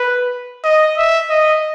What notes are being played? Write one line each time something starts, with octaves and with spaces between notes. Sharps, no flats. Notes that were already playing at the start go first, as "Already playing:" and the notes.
Already playing: B4
D#5
E5
D#5